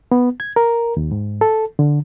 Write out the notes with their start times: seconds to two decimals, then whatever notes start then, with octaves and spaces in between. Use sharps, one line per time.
0.12 B3
0.40 G#6
0.56 A#4
0.97 D#2
1.12 G#2
1.41 A4
1.79 D3